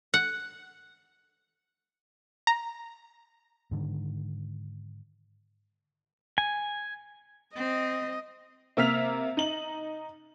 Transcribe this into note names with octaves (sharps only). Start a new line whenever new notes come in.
F#5
A#5
G#2 D3 D#3
G#5
C4 D#5
C3 A#3 E6 F6 B6 F7
D#4 F#7